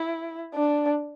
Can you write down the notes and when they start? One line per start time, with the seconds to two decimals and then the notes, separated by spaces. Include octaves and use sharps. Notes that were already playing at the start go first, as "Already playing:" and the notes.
Already playing: E4
0.54 D4